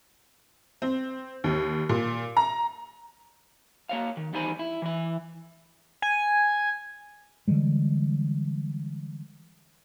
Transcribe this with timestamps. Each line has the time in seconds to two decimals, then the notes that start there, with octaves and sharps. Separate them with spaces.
0.82 C4
1.44 D#2
1.89 A#2
2.37 A#5
3.89 A#3 C#5 F5
4.17 D#3
4.33 E2 G3 D#4 C5 G#5 B5
4.59 E4
4.82 E3 E4
6.02 G#5
7.48 D3 E3 G3 G#3